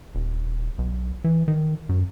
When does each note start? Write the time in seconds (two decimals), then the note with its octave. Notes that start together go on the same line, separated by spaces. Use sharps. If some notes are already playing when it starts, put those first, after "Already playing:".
0.15 D#1
0.78 B1
1.24 E3
1.48 D#3
1.89 F#2